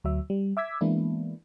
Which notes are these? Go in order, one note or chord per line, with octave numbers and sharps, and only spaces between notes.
D2 F#3 E5
G3
E5 D6 E6 G#6 B6
E3 G#3 A#3 B3 D4 E4